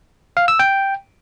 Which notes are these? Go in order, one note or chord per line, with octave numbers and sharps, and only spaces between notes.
F5
E6
G5